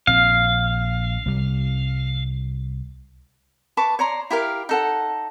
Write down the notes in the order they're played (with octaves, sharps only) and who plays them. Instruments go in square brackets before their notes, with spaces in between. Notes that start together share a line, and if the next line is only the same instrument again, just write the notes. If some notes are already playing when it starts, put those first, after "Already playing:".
[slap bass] A#1 C4 [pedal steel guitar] F5
[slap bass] C2 G3
[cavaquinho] B4 A5 C#6 D6
C#5 D5 A#5 C6
E4 G4 A#4 F5
D#4 A4 F#5